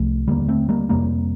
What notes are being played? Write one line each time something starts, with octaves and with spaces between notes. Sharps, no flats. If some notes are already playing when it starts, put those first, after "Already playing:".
Already playing: C2 C3 F3 A3
D#2 D3 G3 A#3
A3 C4
G3 A#3
F2 C3 G3 A#3